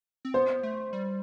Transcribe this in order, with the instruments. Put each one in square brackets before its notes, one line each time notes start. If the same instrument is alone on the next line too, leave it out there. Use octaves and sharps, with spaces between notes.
[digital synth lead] C4
[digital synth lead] B3 [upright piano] C5
[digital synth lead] A3
G3